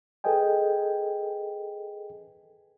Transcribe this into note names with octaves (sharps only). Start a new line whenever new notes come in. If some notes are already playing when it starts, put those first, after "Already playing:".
G#4 A4 B4 D#5 G5 G#5